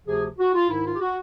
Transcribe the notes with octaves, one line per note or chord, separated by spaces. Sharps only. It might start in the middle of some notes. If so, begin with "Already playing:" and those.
D2 C3 F3 G#4
F#4
F4
G#2 D#3 E4
F4
G4
F#4